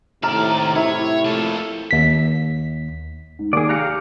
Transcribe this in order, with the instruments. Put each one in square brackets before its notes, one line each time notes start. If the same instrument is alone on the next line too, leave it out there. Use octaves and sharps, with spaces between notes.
[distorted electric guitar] D#2 D5 [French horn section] A2 C3 [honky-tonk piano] A#5 F6 E7
[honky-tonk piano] E4 [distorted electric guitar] C#5
[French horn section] F2 A3 [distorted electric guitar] A#3 A4
[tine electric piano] D#2 B6
[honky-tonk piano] G#2
[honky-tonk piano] D#2 [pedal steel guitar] G#4 D5
[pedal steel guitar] G4 F5 A#5 [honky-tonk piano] F#6 A#6 C#7